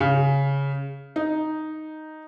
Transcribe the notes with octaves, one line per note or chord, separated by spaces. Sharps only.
C#3
D#4